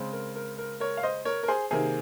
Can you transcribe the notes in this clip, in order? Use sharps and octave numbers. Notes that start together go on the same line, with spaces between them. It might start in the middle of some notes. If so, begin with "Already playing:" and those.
Already playing: C#3 G#3 C4
A#4
A#4
A#4
A#4 C#5
F5
C5 D#5
A#4 C#5
A#4
G#4 C5
C3 D#3 A#3 G#4